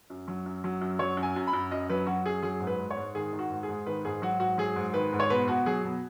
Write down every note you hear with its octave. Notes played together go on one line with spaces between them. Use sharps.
F#2
F#3
F#2
F#3
F#2
F#3 C#5
F#2
G#5
F#2
B5
F#2
F#2 D#5
F#3 B4
F#3 F#4
F#2 G#4
F#3 G#4
G#2
B4
G#2
C#5
G#2
D#3 G#4
D#3
F#4
G#2
G#4
G#2
D#3 B4
G#2 G#4
F#3 F#4
G#2 F#4
F#3 G#4
G#2
D#3 B4
G#2
C#5
B2 B4
B2 F#4
F#3 G#4
B2